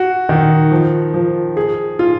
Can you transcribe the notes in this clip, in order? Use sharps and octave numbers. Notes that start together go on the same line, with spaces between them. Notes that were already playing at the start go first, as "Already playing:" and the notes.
Already playing: F#4
D#3
F3
F3
G#4
F4